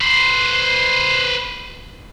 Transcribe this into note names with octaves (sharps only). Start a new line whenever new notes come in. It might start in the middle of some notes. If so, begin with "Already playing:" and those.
B4 C5